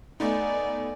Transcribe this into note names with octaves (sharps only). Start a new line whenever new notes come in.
A3 B3 D#4 D5 G#5